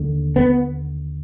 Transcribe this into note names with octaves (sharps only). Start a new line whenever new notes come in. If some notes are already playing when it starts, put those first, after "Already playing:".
Already playing: D#2 D3
B3